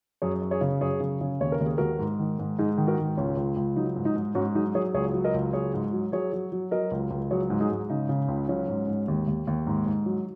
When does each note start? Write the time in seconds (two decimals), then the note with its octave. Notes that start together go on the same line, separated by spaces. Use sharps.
0.22 F#2 G#4 C#5
0.42 F#2
0.51 G#4 C#5
0.61 C#3
0.81 F#2 G#4 C#5
1.00 C#3
1.21 C#3
1.40 D#2 C#5
1.52 A#4
1.60 D#2
1.66 G#4
1.78 D#2 F#4 A#4
1.99 G#2
2.19 D#3
2.39 G#2
2.59 G#2 D#4 G#4
2.78 D#3
2.87 F#4 A#4
2.98 G#2
3.17 C#2 C#4
3.37 C#2
3.56 C#2
3.76 F#3 D#4
3.96 G#2
4.05 D#4
4.16 G#2
4.35 G#2 C#4 F#4
4.55 F#3 D#4 G#4
4.75 F#3 G#4 C#5
4.94 C#2 G#4 C#5
5.14 F#3
5.24 A#4 D#5
5.34 C#2
5.53 F#3 G#4 C#5
5.74 G#2
5.93 F#3
6.12 F#3 G#4 C#5
6.33 F#3
6.52 F#3
6.71 F#3 A#4 D#5
6.91 C#2
7.10 C#2
7.31 F#3 G#4 C#5
7.50 G#2
7.60 D#4 G#4
7.70 G#2
7.90 C#3 D#4
8.09 C#3
8.28 C#2
8.48 F#3 C#4 F#4
8.68 G#2
8.88 G#2
9.08 D#2
9.27 D#2
9.47 D#2
9.67 G#2
9.86 G#2
10.06 F#3